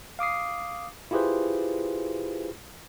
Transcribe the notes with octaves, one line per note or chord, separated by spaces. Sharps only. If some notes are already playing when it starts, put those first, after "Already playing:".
F5 D6 D#6 C7
E4 F4 G4 G#4 B4 C5